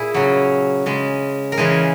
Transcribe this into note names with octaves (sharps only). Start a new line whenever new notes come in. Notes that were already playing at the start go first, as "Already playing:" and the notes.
Already playing: A#2 E4 G#4
C#3 F#3
C#3 G#3
A#4
C#3 E3 G#3 G#4